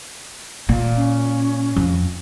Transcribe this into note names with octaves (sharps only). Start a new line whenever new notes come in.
A#2
C#4
F2